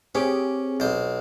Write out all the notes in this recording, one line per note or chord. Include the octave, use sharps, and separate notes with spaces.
C4 C#4 G4 G#4 D6
B1 C5